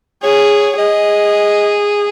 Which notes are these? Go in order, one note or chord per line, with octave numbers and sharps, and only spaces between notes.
G#4 C#5
G#4 D#5